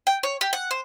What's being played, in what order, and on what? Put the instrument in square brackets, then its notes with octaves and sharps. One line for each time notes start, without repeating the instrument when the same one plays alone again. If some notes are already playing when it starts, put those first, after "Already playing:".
[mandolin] G5
C#5
G4
F#5
C5